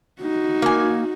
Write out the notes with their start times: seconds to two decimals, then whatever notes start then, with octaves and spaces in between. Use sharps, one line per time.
0.21 D#4 F#4
0.62 A#3 G#5